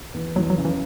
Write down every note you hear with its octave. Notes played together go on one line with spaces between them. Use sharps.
E2
E2 F#3
F#3
C#3
E3